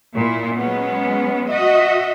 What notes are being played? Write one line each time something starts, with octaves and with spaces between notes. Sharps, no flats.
A#2 E4
F#3 G#3 B3 C#4
F#4 D#5 E5